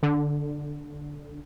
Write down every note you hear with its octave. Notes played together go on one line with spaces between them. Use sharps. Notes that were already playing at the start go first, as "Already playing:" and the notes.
D3